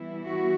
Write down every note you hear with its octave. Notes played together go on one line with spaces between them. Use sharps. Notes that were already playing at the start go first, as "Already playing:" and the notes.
Already playing: E3 G3 B3 E4
F#4